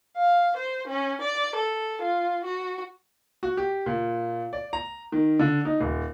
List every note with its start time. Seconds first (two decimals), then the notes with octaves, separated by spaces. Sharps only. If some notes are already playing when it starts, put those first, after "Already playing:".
0.17 F5
0.57 C5
0.88 C#4
1.22 D5
1.56 A4
2.02 F4
2.45 F#4
3.43 F#4
3.57 G4
3.86 A#2
4.53 D5
4.73 A#5
5.12 D#3
5.40 D3
5.65 D#4
5.80 D#1